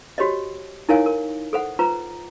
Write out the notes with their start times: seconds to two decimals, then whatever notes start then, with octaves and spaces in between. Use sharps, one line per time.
0.18 F#4 G4 C5 C#5 D#5
0.89 D#4 E4 A#4 C#5 F5 G#5
1.06 A#4
1.53 A4 C5 F#5
1.79 F4 B4 C5 A#5